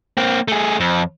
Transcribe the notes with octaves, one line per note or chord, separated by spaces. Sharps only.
A#3 C4
A3 G#4
F2